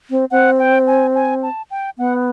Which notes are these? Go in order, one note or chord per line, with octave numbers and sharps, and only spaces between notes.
C4
C4 F#5
G5
G#5
G#5
A5
G5
B3 F#5